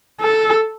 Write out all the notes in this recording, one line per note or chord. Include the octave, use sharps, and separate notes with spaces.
A4